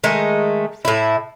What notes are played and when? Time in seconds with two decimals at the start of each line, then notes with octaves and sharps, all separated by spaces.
0.04 D#3 G#3 A3
0.85 A2 E4